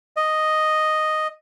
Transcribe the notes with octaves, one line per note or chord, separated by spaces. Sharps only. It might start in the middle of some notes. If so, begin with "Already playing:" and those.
D#5